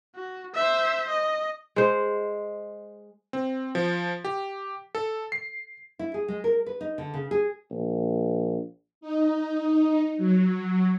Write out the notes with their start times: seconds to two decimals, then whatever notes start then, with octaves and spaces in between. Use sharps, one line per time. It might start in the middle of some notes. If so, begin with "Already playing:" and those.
0.15 F#4
0.54 C5 E5
1.10 D#5
1.76 G#3 C5
3.33 C4
3.75 F3
4.25 G4
4.95 A4
5.32 C7
5.99 E4
6.14 G#4
6.28 G#3
6.44 A#4
6.66 B4
6.81 D#4
6.98 D3
7.14 C#3
7.31 G#4
7.71 A#1
9.01 D#4
10.17 F#3